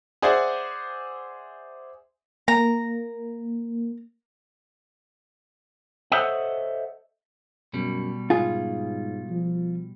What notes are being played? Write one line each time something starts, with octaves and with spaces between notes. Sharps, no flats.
G#4 C5 D5 E5 F#5 G#5
A#3 A#5
A4 C5 C#5 D#5 E5 F#5
F#2 B2 G3
G#2 F4 G#4
F3